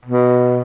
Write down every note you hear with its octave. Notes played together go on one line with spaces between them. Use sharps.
B2